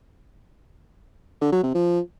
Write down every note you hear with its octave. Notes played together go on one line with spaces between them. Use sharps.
D3
F#3
C3
F3